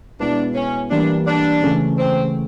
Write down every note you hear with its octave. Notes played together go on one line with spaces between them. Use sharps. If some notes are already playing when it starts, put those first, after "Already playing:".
B2 G#3 B3 D4 E4
C#4
E3 G3 A#3 D4
D4
C#3 E3 A3 C#4
C4